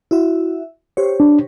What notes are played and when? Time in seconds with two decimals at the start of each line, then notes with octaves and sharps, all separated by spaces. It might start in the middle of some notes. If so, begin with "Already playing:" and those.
0.11 E4 F#4 E5
0.97 G4 C5 C#5
1.20 D4